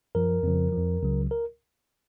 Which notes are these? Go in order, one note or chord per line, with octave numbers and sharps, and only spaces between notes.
F#2 F3 A#4
F2 C#3 F3
F2 F3
C#2 C#3 F#3
A#4